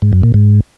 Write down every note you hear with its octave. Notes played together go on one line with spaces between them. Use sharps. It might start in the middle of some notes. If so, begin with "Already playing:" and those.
G#2
F#2
A#2
G#2